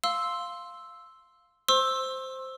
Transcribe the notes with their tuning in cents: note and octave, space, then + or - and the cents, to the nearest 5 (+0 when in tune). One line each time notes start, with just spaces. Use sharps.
F5 +0 C6 +0 E6 +0
C5 +0 C6 +35 E6 +0